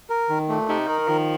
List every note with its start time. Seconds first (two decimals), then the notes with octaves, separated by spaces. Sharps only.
0.10 A#4
0.29 D#3
0.49 A#2 A3
0.68 C3 D#4
0.87 D#3 A#4
1.08 D#3 F3